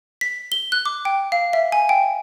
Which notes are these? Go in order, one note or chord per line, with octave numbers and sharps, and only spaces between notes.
B6
G7
F#6
D6
G5
F5
E5
G#5
G5